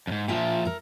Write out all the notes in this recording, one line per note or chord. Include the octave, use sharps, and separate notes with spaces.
F2 G#2
A#2 F3 F4 E5 G5
A4 A#4